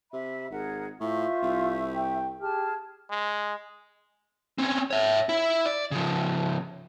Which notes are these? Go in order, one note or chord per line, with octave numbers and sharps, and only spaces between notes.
C3 E5 B5
G#1 G#4 A#4 F#5
A2 F4 C5 E5 C#6
C2
G5
G4 G#4 A5 F6
G#3
C4 C#4
C#5 E5
E4
D5
C#3 F3